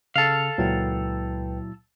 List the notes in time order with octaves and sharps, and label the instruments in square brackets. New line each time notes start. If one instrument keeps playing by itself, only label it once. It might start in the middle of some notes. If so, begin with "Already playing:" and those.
[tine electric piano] C#3 [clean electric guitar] A4 F5
[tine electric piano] C#2 B4 G5 [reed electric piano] A#2 F#3 E4